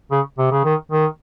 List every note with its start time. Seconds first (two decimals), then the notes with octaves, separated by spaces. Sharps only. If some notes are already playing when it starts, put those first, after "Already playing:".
0.11 C#3
0.38 C3
0.51 C#3
0.65 D#3
0.91 D#3